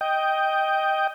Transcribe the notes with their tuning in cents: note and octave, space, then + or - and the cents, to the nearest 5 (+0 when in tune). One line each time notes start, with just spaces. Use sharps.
D#5 +5 G5 +0